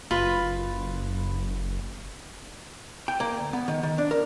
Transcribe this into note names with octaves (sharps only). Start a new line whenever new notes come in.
F#1 F4 B4 B5
G5
A#3
D2
B3
D#3
D#3
D4
A#4